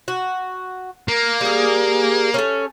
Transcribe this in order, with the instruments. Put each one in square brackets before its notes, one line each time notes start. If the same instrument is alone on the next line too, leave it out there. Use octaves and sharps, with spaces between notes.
[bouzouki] F#4
[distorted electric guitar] A#3
[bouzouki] G3 G#4
A3 C#4